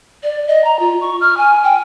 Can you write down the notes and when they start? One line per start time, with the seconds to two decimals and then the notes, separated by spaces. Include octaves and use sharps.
0.23 D5
0.48 D#5
0.64 A#5
0.79 F4
1.01 C#6
1.21 F6
1.37 G#5
1.64 G5